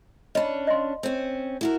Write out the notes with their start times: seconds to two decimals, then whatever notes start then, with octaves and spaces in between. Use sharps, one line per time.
0.35 C#4 D4 D#5 B5
0.67 D#5 F5 C6
1.03 C4 C#4
1.61 E4 F#4 A#4